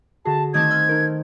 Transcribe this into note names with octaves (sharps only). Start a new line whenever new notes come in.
D3 F#4 G#4 A5
D#3 A3 C4 A5 D6 D#6 G#6
D#5 E6 F6
D#4 A#4